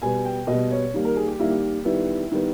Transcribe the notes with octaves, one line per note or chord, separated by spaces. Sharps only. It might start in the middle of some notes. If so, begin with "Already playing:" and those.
B2 G3 B3 G#5
G5
B2 G3 B3 D#5
C#5
D#3 G3 A#3
A#4
G#4
G4
D#3 G3 A#3 E4
G4
D#3 G3 B3 E4
D#3 G3 B3